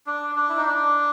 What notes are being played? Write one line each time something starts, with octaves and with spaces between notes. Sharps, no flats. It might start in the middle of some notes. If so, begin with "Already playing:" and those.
D4
D4
E4
D#4
D4